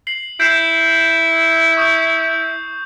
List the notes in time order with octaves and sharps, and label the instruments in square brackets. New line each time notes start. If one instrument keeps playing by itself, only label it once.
[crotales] C7 F#7
[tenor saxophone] E4 [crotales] G6 C7 E7
[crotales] C#6 D#6 G6